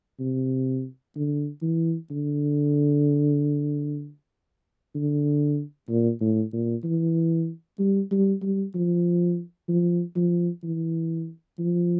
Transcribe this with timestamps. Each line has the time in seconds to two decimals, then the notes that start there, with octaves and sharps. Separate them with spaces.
0.20 C3
1.16 D3
1.62 E3
2.11 D3
4.95 D3
5.89 A#2
6.21 A2
6.53 A#2
6.84 E3
7.79 G3
8.11 G3
8.42 G3
8.75 F3
9.69 F3
10.16 F3
10.63 E3
11.59 F3